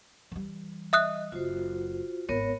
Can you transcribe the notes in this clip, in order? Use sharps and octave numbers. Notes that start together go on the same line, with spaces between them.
E3 G3
D#5 E5 D#6 F#6
F#1 F4 F#4 C5
G#1 B3 C4 A#4 C#5